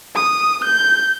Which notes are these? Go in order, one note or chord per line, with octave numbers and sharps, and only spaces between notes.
D#6
G6